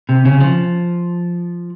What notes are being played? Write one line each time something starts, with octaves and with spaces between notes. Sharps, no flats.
C3
C#3
F3